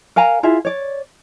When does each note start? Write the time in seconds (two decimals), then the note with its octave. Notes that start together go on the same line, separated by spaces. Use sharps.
0.16 A#4 F5 G#5 A#5
0.43 E4 F4 G#4 E5
0.65 C#5 D5